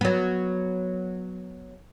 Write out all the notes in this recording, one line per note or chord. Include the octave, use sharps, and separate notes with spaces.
F#3 B3